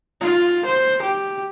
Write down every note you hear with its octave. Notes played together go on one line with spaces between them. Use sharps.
F4
C5
G4